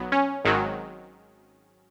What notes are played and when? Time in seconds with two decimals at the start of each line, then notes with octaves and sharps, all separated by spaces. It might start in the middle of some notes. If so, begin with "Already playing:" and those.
Already playing: B1 F#3 B3
0.12 C#4
0.45 G#1 G#2 D#3 F#3